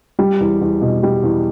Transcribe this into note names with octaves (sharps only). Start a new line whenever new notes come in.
G3
E2
E2
B2
G3
E2